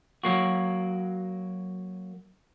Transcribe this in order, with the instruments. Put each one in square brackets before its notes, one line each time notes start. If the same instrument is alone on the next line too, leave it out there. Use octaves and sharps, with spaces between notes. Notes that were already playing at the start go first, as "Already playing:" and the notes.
[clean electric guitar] F#3 A#3 F#4